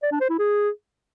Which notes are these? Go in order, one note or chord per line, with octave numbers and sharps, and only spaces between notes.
D5
D4
C5
E4
G#4